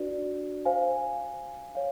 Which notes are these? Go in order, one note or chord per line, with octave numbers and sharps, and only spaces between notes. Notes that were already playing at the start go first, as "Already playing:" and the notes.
Already playing: D4 F#4 B4 D5
C5 F5 G#5
C#5 F5